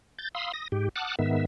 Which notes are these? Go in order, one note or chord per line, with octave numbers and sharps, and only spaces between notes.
G6 A6
F5 B5 C6 D#6 E6
D#6 A#6
G#2 G4
F#5 A5 D6 D#6 F6 F#6
G#2 D#3 B3 E5